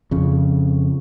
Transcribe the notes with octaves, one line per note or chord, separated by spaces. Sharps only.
F2 C#3